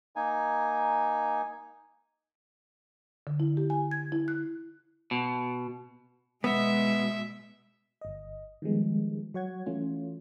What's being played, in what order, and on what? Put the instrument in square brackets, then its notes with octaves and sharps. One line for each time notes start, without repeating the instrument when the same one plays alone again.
[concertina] A#3 D#4 G#5
[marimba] D3
E4
G4
G#5
G#6
E4
F#6
[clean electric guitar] B2
[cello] B2 G#3 [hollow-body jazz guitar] B3 [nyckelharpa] E5
[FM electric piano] G1 D#5
D#3 F3 G3 G#3 B3
F#3 C#5 F#5 G#6
E3 A3 C#4 F4